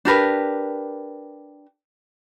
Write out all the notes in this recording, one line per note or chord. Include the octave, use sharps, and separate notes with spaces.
D4 G4 A#4 B4